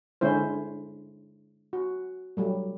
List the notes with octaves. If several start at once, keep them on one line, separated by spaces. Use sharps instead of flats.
D3 G#3 C#4 E4 C5
F#4
F#3 G3 A3